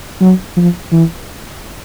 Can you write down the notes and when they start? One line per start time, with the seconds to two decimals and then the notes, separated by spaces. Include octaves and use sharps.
0.21 F#3
0.57 F3
0.92 E3